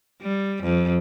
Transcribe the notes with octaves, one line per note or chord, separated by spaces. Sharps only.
G3
F2